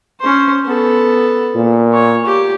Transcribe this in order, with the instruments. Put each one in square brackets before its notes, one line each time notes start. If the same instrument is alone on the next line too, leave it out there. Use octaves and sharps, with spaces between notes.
[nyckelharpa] C#4 C5
B3 A4
[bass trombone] A#2
[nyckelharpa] C#5
G4